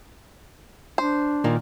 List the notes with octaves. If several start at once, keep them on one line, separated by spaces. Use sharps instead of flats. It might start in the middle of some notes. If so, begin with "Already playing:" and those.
D4 C5
A#2 D#3 A#3